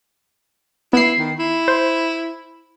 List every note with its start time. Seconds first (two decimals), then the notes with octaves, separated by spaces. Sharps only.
0.93 B3 E4 C7
1.19 D#3
1.39 E4
1.68 C5